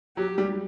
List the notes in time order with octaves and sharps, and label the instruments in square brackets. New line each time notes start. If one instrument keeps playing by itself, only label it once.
[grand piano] F#3 [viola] G4
[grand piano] G3